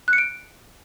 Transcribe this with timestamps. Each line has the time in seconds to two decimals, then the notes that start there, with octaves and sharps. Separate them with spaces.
0.08 F#6
0.13 C#7
0.18 D7